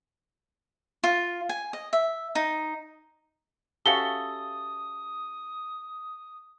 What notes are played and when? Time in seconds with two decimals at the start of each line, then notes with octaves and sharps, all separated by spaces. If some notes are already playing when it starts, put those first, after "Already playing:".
1.04 F4
1.49 G#5
1.73 D#5
1.93 E5
2.35 D#4
3.86 C#4 F#4 G4 A4 E5 F5 D#6 G7